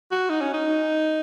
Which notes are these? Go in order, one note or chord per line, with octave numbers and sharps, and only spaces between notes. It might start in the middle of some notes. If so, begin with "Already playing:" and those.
F#4
D#4
C#4
D#4